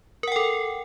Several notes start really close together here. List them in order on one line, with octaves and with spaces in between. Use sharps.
A#4 F#5 G5 A4